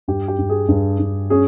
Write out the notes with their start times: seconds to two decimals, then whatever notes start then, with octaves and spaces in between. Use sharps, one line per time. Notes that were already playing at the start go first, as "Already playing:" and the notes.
0.08 G2 G4
0.28 G4
0.39 G2
0.49 G#4
0.69 G2
0.99 G2
1.30 C#4 G#4